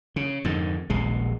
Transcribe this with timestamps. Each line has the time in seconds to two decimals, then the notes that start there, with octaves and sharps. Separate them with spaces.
0.16 C#3
0.45 F2 G#2 D3 D#3
0.90 D#1 A#1 B2 G#3